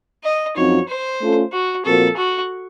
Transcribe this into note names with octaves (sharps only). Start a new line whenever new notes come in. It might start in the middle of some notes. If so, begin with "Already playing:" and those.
D#5
F#2 F3 C4 D#4 F#4 C#5
C5
A3 C#4 F4 A4
F#4
A#2 F3 C4 F#4 A4 A#4
F#4